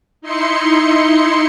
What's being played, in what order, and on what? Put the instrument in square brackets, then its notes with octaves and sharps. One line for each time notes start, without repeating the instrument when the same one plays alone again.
[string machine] D#4 E4 C6 C#7